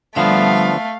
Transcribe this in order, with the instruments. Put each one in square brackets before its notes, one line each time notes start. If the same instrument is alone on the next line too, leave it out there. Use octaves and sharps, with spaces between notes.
[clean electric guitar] D3 F3 B3 [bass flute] G3 [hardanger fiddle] A3 [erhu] F5